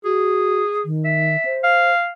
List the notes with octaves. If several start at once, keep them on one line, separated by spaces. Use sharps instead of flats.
F#4 G#4
D#3
E5
C5
F5